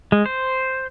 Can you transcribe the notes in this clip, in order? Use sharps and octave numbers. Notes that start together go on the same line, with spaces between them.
G#3
C5